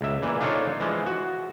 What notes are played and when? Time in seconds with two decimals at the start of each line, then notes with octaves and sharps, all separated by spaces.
0.01 C#2 E5
0.22 A#2 E3
0.40 D4 D#4 F4 A4 C5 C#5
0.80 E3 F3 G#3
1.06 F#4